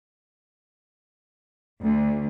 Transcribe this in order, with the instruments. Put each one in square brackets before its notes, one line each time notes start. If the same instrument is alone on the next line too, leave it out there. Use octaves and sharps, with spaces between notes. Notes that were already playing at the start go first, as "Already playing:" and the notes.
[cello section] D2